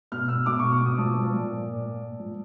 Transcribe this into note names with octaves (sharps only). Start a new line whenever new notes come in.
B2 F6
B2 E6
B2 D6
B2 C#6
C#6
B2
D#6
F3 A5
F3
A#2
A#2
A#2
A#2
A#2
F3